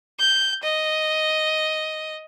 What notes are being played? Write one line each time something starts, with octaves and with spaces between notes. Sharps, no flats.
G6
D#5